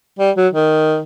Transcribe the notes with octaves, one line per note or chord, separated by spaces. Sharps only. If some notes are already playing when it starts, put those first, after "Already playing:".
G3
F#3
D#3